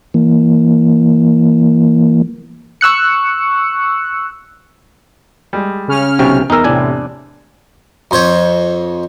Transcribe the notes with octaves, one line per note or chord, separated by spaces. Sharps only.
E3 A#3
C#6 E6 F#6 C#7
G3 G#3
C#3 C#4 F6
B1 C3 G5 C#6
E2 D#4 A#4 E6
A2 C3 D4 G#5
F2 C5 C#5